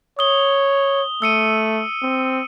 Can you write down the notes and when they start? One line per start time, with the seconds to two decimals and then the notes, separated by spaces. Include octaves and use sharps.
0.19 C#5 D#6 G7
1.22 A3 E6 C#7 D#7
2.02 C4